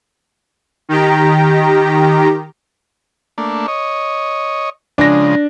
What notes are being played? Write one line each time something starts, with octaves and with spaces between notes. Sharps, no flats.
D#3 G4 A#5
A3 A#3 D4
C#5 D#5
C#3 F3 G#3 D4 A#6